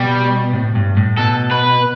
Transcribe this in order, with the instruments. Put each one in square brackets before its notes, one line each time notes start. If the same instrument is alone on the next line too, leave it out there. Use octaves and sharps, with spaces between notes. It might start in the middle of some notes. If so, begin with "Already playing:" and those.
Already playing: [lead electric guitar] B2 [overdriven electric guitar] G3
[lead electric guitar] A2
G2
A2
[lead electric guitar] B2 [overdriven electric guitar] A4
[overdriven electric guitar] B4